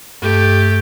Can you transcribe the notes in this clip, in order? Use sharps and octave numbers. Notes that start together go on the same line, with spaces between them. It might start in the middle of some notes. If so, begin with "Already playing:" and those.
G2 A3 G4